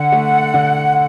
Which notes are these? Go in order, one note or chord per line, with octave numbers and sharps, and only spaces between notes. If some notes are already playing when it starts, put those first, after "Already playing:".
Already playing: D3 F#5
A3
D3